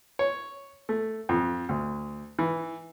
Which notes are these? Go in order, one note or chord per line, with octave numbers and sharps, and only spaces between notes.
C#5
A3
F2
D2
E3